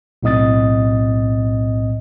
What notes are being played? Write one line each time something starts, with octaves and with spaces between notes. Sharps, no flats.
B1 A2 C4 D#5 D#6 A6